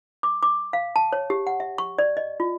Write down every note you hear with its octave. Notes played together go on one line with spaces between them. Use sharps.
D6
D6
F5
A5
C#5
G4
F#5
E5
C#6
D5
D#5
F4